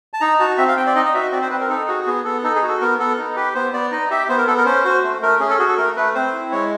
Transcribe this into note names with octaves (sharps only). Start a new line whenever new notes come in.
A5
D#4 A#5
F#4 A5
C4 E5
F5
C4 G5
D5
D#4 D#5
D#5
F#4 E5
C4 D5
C5
C4 B4
A#4
D#4 A4
F#4 G#4
B3 G#4
B3 A4
D#4 A4
G#4
F#4
A4
B3 A#4
B3 A4
D#4
G4 B4
B3 C5
B3 D5
D#4 D#5
G4 E5
B3 C5
A#4
B3 A4
A#4
C#4 C5
F#4 C5
A3
A3 A#4
C#4 G#4
A4
F#4 G#4
A4
A3 A#4
A3 B4
C4 C5
E4
G#3 C#5